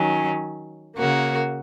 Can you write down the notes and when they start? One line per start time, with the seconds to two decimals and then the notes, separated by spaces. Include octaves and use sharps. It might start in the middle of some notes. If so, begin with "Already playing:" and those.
Already playing: D#3 F#3 C#4
0.97 C#3 A#3 F#4 A#4